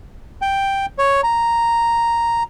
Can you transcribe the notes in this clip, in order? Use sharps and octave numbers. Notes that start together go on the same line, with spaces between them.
G5
C#5
A#5